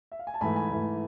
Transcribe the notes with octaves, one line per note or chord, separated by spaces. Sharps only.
E5
F5
G#5
A5
G#2 E3 A3 G#5 B5
G#5 B5
G#2 E3 A3